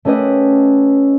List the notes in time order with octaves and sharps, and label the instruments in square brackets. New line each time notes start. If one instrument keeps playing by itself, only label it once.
[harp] A3 C#4 G4 B4 D#5